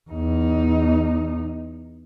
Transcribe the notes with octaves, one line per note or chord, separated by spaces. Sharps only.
E2 D#4